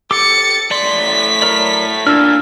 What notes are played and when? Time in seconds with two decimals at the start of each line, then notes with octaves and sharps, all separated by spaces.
0.11 G4 A4 D6 A6 C#7
0.71 A2 D5 C6 B6
1.42 F#3 A#4 D5
2.07 A#2 D4 E6 F6